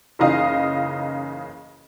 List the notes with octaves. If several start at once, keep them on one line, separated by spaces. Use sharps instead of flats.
F#1 C#3 E3 D#4 D#5 F5